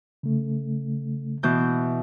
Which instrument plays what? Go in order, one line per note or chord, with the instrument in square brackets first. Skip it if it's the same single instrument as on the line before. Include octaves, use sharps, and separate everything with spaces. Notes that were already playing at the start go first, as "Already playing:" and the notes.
[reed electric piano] C#3 A3
[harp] B2 E3 G6